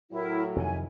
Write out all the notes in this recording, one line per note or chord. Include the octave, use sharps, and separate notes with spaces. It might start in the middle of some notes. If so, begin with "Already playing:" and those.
A2 F#3 E4 A#4
F2 C3 D#3 C#5 G#5